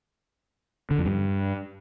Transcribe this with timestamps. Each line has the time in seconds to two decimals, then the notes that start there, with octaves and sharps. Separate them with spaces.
0.91 D3
0.98 F2
1.06 G2